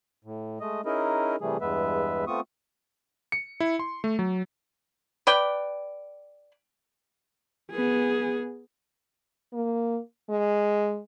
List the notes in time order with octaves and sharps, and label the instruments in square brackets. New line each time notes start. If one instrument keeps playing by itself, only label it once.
[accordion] A2
G#3 A3 D#5
C#4 D#4 E4 G#4 A#4 D#5
C3 E3 G3 A3 G#4
E2 G2 G#3 B3 B4 E5
A3 B3 C4 F4 C#6 D#6
[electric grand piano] C#7
E4
C6
A3
F#3
[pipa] B4 D5 G5
[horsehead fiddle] B3 G#4
[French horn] A#3
G#3